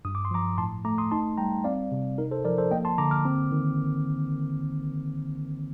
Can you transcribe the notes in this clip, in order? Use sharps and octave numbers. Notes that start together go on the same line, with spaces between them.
G2 D#6
D6
C6
F3 A#5 D6
A2 A5 C6
A3 A#5 D6
C6 D#6
D#4 A5 C6
G3 G5 A#5
C4 D5 F5
C3
D#4 A#4
A4 C5
F3 A#4 D5
A4 C5
A#3 D#5 G5
A5 C6
D3 A#5 D6
D6 F6
C4
D#3